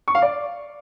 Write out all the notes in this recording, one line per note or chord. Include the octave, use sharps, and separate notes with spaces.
C#6
F5
D5